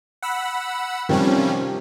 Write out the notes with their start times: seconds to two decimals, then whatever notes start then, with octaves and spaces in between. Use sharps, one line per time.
0.22 F#5 B5 E6
1.09 C3 D#3 F3 G3 C#4